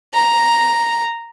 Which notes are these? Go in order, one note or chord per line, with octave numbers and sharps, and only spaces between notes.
A#5